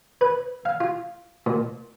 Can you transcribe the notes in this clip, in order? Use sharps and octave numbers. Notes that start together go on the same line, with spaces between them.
B4
F5
F4
A#2